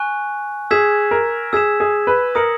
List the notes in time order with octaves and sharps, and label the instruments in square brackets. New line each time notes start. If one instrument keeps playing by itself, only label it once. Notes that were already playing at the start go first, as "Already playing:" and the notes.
Already playing: [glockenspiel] G#5 C#6 F#6
[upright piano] G#4 [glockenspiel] E6 G#6 B6 E7
[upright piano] A#4
[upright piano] G#4 [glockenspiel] E6 G#6 B6 E7
[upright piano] G#4
B4
[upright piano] A#4 [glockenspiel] D#6 A#6 C#7 F#7